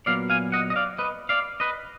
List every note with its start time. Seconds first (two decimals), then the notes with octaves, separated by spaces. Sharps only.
0.06 A#2 F#3 B3 D5 F5
0.30 F5 G#5
0.52 D#5 F#5
0.70 D#5
0.76 D5 F5
0.98 B4 D#5
1.29 D5 F5
1.60 B4 D#5